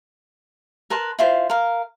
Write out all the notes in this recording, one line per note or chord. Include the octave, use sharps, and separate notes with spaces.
A#4 B4 A5 C6
E4 F4 C5
A#4 F5